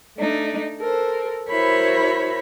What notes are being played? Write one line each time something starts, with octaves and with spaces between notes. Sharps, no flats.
A3 D4 D#4
A4 A#4 C5
E4 F#4 A#4 C5 C#5 B5